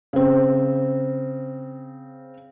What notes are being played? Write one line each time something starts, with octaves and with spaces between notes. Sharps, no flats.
C#3 C4